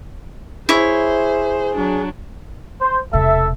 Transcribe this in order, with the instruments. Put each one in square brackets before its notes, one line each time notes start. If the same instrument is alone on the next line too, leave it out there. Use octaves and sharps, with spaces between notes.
[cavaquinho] E4 C#5 [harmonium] G#4 [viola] C5
[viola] F#3 D4
[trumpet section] C5
[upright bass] E1 C3 [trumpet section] A4 E5